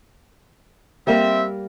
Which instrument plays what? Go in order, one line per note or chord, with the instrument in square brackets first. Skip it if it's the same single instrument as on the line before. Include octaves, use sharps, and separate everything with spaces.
[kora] G3 A#3 A#4 [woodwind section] C4 E5